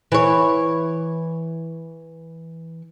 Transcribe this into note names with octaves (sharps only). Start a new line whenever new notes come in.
E3 C#5